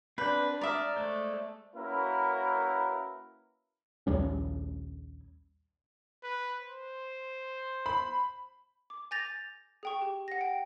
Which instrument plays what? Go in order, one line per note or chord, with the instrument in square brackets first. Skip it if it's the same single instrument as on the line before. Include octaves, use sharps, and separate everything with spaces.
[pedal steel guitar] C4 F#6 G6 [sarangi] D4 [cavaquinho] B4
[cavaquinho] D5 E5 [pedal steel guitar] A#5 D#6 F6
[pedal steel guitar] G#3 C5 [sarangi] A3
[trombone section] A#3 C#4 E4 F#4 A#4 B4
[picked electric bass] A#1 D#2 G3 C#4
[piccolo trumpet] B4
C5
[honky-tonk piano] B5
[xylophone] D6
G#5 D6 G6 A6 A#6 F7
G#4 G5 C#6
G4
F#5 A#6
G5